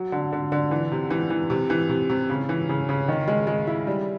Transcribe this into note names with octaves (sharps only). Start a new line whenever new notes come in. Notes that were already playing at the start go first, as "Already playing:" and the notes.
Already playing: F#3
D3
D3
D3
E3
C3
E3
E3
C3
E3
C3
C3
C#3
E3
C#3
C#3
D#3
G#3
G#3
E4
G3